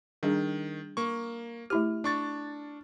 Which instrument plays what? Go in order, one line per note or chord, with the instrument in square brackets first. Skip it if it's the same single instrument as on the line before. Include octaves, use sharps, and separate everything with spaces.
[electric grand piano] D#3 [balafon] G3 D4 G#4
[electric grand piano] A#3 C#6
[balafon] A3 E4 G4 [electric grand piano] F6
[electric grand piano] D4 C#6 A6